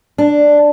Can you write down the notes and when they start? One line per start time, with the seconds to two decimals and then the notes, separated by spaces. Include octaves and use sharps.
0.18 D4